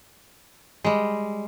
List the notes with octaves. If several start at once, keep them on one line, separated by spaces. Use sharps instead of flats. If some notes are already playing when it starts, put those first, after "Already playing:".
G3 G#3